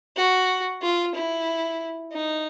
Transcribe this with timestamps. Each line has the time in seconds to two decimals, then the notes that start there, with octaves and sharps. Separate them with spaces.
0.16 F#4
0.82 F4
1.15 E4
2.13 D#4